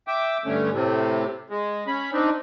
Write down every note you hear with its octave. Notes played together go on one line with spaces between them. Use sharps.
E5 G5 D6
G2 D3 A3 C#4
A2 C3
G#3
C#4 B5
C4 D4 D#4